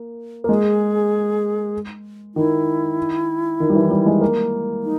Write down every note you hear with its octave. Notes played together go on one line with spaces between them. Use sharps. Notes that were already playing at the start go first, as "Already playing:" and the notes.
Already playing: A#3
A#3
G#3 G#4
D#3 E4
D#3
G3
E3
G3
G#3
A#3
D#4